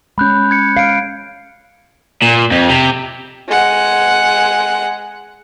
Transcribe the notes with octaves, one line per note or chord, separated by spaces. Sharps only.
G#3 C#4 B5 F#6 G6
G#6 C#7
F5 C7 D7
A#2
F2
C3
G#3 F#5